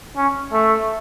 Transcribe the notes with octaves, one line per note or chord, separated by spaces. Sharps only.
C#4
A3